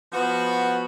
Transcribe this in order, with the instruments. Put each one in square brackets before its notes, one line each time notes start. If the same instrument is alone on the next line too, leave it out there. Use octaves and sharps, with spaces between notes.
[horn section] F3 B3 F#4